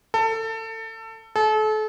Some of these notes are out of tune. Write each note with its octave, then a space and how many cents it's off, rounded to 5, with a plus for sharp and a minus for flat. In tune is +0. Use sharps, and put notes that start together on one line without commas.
A4 +25
A4 -35